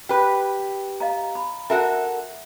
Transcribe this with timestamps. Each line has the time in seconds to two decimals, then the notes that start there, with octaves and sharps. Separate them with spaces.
0.09 G4 B4
1.00 D#5 F5 A#5
1.35 B5
1.70 F#4 A4 A#4 E5 F#5